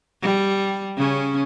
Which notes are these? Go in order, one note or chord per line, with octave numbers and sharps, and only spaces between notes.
G3
C#3 C#4